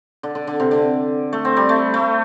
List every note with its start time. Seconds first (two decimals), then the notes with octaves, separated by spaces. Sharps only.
0.23 D3
0.35 D3
0.47 D3
0.60 C3
0.71 D3
1.33 A3
1.45 C4
1.57 G3
1.69 A3
1.94 A3